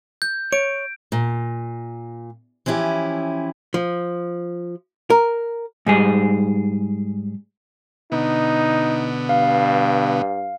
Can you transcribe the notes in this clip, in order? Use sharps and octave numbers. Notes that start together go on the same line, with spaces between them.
G6
C#5 D7
A#2
E3 F3 C#4 E4 G4
F3
A#4
G#2 G3 G#4
B2 D3 B3 D#4
G2 F5